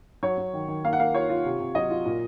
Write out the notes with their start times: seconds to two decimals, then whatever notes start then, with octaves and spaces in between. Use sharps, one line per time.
0.23 F#3 C#5
0.38 F#3
0.53 D#3
0.68 D#3
0.84 A#3 F5
0.93 F#5
0.99 A#3 F5
1.14 F4 C#5
1.29 F4
1.45 C3
1.60 C3
1.75 F#3 D#5
1.90 F4
2.06 A#2